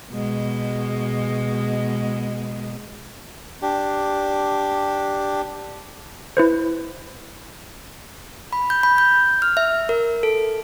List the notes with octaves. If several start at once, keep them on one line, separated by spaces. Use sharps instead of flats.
B2 G#3
D4 G4
E4 B4 C5
B5
G6
B5
G6
F6
E5
A#4
A4